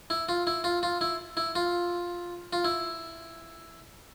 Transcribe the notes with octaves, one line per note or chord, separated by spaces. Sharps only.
E4
F4
E4
F4
F4
E4
E4
F4
F4
E4